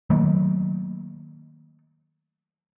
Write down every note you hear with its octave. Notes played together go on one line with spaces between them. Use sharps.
D#3 F#3 A3 A#3